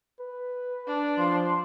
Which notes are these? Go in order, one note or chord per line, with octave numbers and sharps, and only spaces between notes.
B4
D4
F3 C6